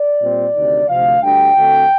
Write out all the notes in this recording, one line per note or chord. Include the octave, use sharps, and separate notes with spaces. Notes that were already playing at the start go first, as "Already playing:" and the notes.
Already playing: D5
A#2 G3 C4
D2 C3 D#3
D2 C3 F3 C4 F5
D2 D3 G3 D4 G5
D2 D3 A3 C4